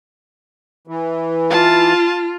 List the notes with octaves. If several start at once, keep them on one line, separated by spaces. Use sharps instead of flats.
E3
F4 A5